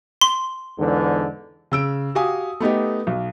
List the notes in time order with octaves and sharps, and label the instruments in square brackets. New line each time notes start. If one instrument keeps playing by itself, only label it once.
[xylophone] C6
[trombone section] E2 G#2 D3
[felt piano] C#3 E6 D7
F#4 G4 F5 G#5 D#6
A3 B3 D#4 G4
B1